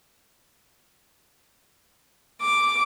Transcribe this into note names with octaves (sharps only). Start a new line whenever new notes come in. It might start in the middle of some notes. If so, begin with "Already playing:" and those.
D6